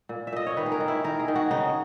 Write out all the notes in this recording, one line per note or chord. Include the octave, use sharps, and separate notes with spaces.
A#2
E5
A#2 D#5
C#5
D#3 B4
G#4
A#4
D#3
E4
D#3 A#4
G#4
D#3
F#4
C#3 D#4